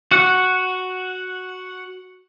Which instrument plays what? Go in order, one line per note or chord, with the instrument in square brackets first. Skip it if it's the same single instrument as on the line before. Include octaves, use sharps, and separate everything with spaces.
[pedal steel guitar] F#4 F#5